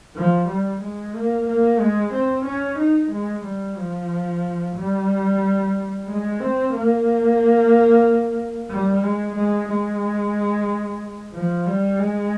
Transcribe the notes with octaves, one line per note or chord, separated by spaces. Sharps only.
F3
G3
G#3
A#3
A#3
G#3
C4
C#4
D#4
G#3
G3
F3
G3
G#3
C4
A#3
G3
G#3
G#3
G#3
F3
G3
G#3